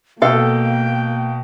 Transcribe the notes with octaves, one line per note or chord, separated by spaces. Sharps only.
B2 A#3 A4 F5 G5